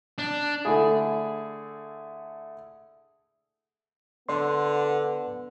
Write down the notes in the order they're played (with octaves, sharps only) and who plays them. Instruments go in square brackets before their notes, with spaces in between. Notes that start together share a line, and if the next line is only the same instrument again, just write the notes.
[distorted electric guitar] D4
[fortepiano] D3 A3 E4 G#4
[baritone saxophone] D3 [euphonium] B3 [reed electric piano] D5 C6